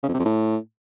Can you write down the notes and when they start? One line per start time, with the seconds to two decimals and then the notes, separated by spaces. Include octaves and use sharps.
0.03 C#3
0.09 F2
0.14 C3
0.20 F2
0.25 A2